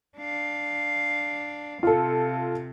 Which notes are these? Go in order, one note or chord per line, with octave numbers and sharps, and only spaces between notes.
D4 F5
C3 F4 A4